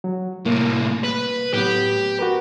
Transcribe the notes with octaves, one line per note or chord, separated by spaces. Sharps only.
F#3
C2 A2 A#3
B4
A2 F#3 B3 G4
F#4 A#4 B4